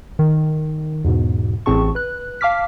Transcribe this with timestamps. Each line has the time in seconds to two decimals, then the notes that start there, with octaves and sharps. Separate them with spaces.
0.19 D#3
1.04 E2 G#2 B2
1.66 A1 A2 C4 G#4 A5 C#6
1.95 B4 F#6
2.41 F5 A5 D6 F6 B6